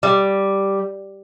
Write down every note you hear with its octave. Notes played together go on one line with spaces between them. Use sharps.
G3